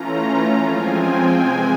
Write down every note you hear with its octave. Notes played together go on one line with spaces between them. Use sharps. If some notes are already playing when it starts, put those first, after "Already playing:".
Already playing: E3 A3 C#4 F4 A#5
F3 G#3 C4 F4 G#5
G5
C3 E3 G#3 G#5